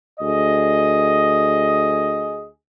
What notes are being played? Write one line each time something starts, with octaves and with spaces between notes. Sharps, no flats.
D2 G#4 D#5